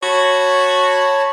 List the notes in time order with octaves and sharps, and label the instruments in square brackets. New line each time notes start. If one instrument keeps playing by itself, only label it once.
[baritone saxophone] F#4 [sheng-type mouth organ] C#5 A5 B5